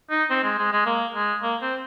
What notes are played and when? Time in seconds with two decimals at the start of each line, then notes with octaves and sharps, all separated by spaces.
0.10 D#4
0.30 C4
0.43 G#3
0.58 G#3
0.72 G#3
0.86 A#3
1.14 G#3
1.42 A#3
1.62 C4